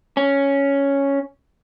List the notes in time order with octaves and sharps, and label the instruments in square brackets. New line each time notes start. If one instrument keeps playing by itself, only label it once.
[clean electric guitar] C#4